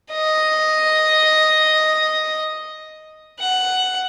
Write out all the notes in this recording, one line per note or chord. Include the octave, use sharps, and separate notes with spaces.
D#5
F#5